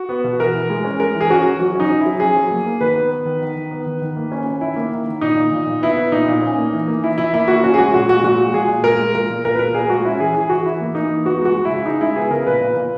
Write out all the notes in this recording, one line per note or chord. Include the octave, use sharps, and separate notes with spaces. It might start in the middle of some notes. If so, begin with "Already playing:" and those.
Already playing: F#4
B3
B2
E3 A#4
E3
G#3
C#4
G#3 A#4
E3
G#4
C#4 F#4
E3
F#3 F#4
C#4 D#4
C#4
E4
F#3
C#4 G#4
F#3
A#3
A#3
D#3 B4
B3
B3
D#3
D#3
D#3
B3
D#3
D#3
A#3
C#4
C#4
D#3 E4
A#3
D#3
D#3
A#2 D#4
A#2
A#2
A#2
B3 E4
B3
A#2 D#4
A#2
C#4
A#3
E3
A#3
E3 E4
E3 E4
A#3 E4
A#3 F#4
C#4 F#4
G#4
G#3 F#4
A#2 F#4
G#3 F#4
A#2 F#4
G#3
A#2 G#4
A#2
G#3 A#4
G#3
A#2 A#4
A#2
A#2 A#4
B4
A#2 A#4
A#2 G#4
G#3 F#4
C#4 E4
E3 G#4
E3 G#4
E3 F#4
E3 E4
A#3
A#3 D#4
E3
B3 F#4
G#3 F#4
G#3
E4
C#3
C#3 D#4
G#3 E4
B3 G#4
C#3 A#4
A#2 B4
A#2
A#2